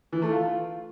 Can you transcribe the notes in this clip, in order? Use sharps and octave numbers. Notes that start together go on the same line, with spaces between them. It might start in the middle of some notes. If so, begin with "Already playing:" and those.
E3
A3
F4